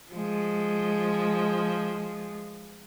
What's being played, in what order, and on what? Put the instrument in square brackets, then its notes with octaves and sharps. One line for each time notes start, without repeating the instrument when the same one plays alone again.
[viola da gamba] F3 G#3